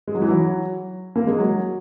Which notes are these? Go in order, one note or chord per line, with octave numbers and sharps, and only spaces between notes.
G#3
F#3
E3
F#3
A#3
G#3
F#3